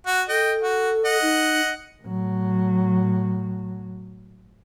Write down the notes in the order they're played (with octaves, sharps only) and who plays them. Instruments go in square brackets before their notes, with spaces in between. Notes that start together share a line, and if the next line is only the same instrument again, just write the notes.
[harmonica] F#4
[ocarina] A4 [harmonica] D#5 G5
[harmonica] F#4
D#5 F#5
[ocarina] D#4
[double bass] A2 F#3